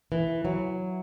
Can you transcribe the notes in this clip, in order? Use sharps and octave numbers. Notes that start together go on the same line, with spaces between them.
E3
F#3